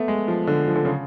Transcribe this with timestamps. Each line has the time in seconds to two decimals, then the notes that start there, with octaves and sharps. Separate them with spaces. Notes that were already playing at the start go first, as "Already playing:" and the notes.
Already playing: A3 B3
0.08 G#3
0.28 F3
0.47 D3
0.68 F3
0.76 D3
0.85 C#3